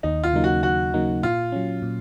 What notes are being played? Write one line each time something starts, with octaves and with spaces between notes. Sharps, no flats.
D#2 D#4
F4
C#3 F#3 A#3 D#4
F#4
D#2 F#4
C#3 F#3 A#3 D#4
A#2 F4
F#3 C#4
A#2